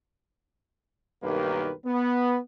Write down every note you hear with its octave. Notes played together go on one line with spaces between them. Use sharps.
B1 G2 D#3 A#3 G4 B4
B3